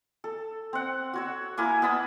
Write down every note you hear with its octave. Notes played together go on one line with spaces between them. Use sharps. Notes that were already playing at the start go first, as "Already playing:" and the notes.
A4
C4 F#5
F#4 C#5 E6
A#3 E4 G#5 D6
B3 A5 B5 D#6